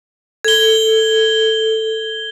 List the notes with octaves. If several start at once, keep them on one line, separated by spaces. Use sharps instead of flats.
A4 G#6 G7